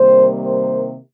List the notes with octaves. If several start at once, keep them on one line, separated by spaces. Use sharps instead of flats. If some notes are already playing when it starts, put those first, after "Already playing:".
Already playing: C3 D#3 G3 A#3 C5
C5